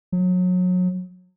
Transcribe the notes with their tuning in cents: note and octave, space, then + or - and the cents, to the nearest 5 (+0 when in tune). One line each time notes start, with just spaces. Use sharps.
F#3 -30